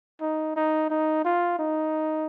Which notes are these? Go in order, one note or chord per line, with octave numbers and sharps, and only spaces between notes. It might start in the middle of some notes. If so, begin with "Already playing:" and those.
D#4
D#4
D#4
F4
D#4